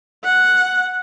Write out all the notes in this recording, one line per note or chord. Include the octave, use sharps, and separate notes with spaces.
F#5